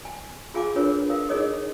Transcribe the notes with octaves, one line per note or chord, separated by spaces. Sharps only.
G#5
F4 G#4 F5 G#5 D6
D4 F4 G#4 A#4 B4 C#5
A#4 F5 D#6
D#4 G#4 A#4 C#5 D#5 D#6